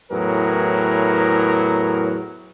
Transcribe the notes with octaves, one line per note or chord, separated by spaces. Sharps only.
E2 A2 F#3 G#4 A#4 B4